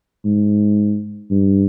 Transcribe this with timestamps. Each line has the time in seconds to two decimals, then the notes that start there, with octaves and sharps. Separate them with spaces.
0.25 G#2
1.31 G2